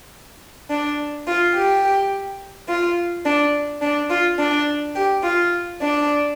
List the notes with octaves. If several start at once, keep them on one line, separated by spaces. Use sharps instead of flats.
D4
F4
G4
F4
D4
D4
F4
D4
G4
F4
D4